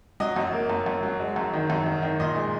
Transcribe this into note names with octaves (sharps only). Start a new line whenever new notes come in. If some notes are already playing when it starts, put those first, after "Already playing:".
F#3 D#5
F#2
A#3
F#2
F#2
F#3
G#3
F#2
D#3
F#2
D#3
D#3
A#2 D#5
G#3